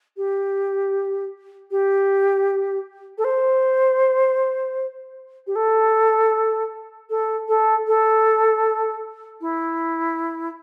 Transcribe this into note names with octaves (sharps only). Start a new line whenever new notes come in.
G4
G4
A4
C5
G4
A4
A4
A4
A4
E4